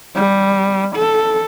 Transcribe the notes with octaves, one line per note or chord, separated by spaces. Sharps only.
G3
A4